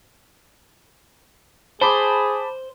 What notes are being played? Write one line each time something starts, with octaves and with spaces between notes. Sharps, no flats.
G#4 C5 A5 B5 D6